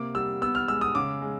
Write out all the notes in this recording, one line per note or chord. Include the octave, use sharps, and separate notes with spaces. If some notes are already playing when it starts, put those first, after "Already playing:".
Already playing: C3 A#3 D6
G3 E6
B3 E6
F6
G#3 E6
D#6
C#3 D6
G#3